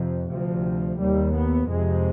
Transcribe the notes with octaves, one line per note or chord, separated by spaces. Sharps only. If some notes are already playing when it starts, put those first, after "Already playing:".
Already playing: F2 C3
D2 C3 F3
D#2 G3
B3
F2 C3 G#3